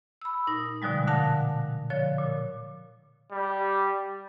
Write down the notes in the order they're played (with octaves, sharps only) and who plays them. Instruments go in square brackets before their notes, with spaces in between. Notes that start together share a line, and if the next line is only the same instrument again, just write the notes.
[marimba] B5 E6
A#2 D#4 A#6
B2 D3 F3 G3 G#3
A#2 D3 F5 F#5 A5 A#6
D3 F3 C#5
A#2
[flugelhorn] G3